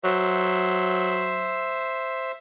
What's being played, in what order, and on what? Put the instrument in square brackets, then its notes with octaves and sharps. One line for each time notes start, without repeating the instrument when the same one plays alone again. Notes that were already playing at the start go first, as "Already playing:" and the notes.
[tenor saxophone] F#3 [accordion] C5 E5